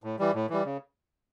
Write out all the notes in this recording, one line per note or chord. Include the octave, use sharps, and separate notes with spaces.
A2
E3 G3
A2
E3 G3
C#3